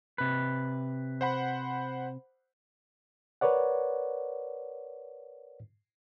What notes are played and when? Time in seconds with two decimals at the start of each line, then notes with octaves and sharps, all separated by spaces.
0.18 C3 B4
1.21 C5 F#5 B5
3.41 A#4 B4 C#5 D5 F#5